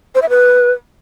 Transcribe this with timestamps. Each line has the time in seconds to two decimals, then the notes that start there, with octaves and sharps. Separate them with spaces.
0.15 C5
0.22 E5
0.29 B4